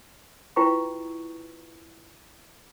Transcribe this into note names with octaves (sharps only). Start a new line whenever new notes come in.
E4 F4 B4 G5 A#5 C#6